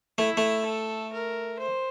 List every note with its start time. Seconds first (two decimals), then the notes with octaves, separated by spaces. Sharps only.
0.18 A3 E4
0.37 A3
0.65 A4
1.13 A#4
1.59 C5